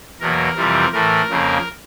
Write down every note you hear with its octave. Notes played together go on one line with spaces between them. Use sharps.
E2 B2 F#3 A#3 A#4
F2 C3 E3 G3 C4
A2 E3 A3 A#4
F2 C#3 F3 A#3